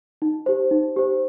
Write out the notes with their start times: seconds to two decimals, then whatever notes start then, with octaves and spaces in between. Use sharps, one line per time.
0.22 D#4
0.46 G4 C5
0.71 D#4
0.96 G4 C5